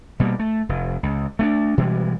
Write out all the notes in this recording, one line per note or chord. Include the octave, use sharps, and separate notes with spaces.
B2 G3 A#3
A3
F1
C#2
A3 C4 D4
B2 E3 G3 G#3